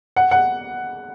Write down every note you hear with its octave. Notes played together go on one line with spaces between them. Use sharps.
F#5
F#5